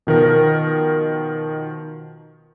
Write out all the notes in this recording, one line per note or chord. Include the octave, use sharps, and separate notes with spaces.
B2 D#3 F3 A#4